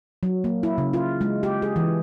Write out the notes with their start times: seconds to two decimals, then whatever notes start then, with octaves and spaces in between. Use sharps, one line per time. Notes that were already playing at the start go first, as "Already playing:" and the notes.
0.23 F#3
0.44 A#3
0.63 E4
0.78 C#3
0.93 F4
1.21 G#3
1.43 G4
1.62 G#4
1.76 E3